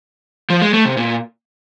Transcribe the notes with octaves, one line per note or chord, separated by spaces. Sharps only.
F3
G#3
A3
C3
A#2